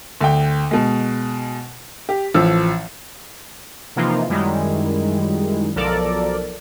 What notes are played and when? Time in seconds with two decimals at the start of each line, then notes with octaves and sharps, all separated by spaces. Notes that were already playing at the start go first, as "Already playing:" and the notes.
0.21 D2 G5
0.71 B2 G#3
2.09 G4
2.34 A1 F3 E6
3.96 C3 E3 F3 A#3 D#4 F4
4.29 F#2 D#3 G3 G#3 E4
5.75 B1 F3 A4 A#4 D5